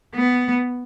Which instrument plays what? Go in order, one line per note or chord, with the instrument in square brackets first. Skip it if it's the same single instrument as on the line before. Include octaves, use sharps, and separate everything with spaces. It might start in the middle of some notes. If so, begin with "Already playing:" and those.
[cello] B3